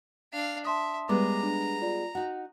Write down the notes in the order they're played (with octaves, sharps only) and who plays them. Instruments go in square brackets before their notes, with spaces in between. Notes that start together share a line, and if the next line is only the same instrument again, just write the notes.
[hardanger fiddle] D4 F5
[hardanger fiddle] E5 [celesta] A5 C6 D#6
[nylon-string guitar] G3 G#3 B3 [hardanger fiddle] A#5 [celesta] D6
[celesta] D4
F4 D5
[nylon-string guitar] D#4 F#4 [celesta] F#5